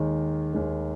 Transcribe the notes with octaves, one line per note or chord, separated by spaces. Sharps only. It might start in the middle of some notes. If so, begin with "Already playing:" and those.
Already playing: D#2 D#3 G#3
D#2 D#3 G#3